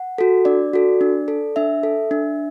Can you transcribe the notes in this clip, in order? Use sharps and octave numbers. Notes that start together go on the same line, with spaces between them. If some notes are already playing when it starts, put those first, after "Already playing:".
Already playing: F#5
F#4 A4
D4 D5
F#4 A4
D4
A4
D4 E5
A4
D4